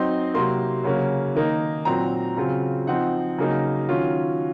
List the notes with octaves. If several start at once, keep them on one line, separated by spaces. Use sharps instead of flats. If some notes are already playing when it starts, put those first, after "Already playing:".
Already playing: F#3 C4 D#4 C6
C3 F#3 A#3 C6
C#3 F#3 A#3 C#4
D#3 A#3 D#4
A#2 F#3 C4 A#5
C#3 F#3 C4 F4
F3 C4 D#4 F#5
C#3 F#3 A#3 D#4
D#3 F#3 C#4 F4